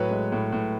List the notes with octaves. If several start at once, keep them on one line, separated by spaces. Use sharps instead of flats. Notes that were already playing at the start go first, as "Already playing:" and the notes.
Already playing: A2 F#3 B4 C#5
G#3
A2
A2